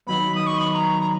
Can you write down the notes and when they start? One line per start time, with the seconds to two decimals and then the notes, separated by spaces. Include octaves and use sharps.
0.07 D#3 F#3 B3 B5
0.35 D#6
0.47 C#6
0.58 B5
0.70 B5
0.74 A#5
1.01 A#5